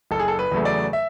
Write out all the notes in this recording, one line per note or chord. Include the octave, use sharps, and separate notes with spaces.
F#1 A4
G#4
A4
B4
E2 C#3 F#3 A3
D5
E5